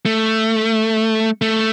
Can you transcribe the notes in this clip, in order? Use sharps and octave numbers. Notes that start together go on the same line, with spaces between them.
A3
A3